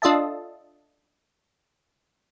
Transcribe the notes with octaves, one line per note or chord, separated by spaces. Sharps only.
D4 F4 A4 D#5 E5 A5